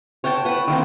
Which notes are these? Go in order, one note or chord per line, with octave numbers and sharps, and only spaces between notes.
C#5 F#5 G5 A5
B4 F#5
D#3 A#3 C4